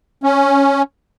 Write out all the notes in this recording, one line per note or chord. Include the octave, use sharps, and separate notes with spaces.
C#4